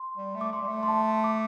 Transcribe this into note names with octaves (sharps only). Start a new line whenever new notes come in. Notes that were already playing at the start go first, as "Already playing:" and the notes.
Already playing: C6
G3
A3
D6
A3 C6
G3
A3
C6
A5
D6